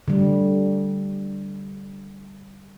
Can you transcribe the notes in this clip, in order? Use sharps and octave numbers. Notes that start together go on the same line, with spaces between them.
D3 G3